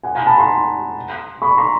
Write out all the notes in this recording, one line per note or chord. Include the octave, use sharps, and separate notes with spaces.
F#5 G#5
G#5 A#5
A5 B5
A#5 C6
B5 C#6
A#5 C6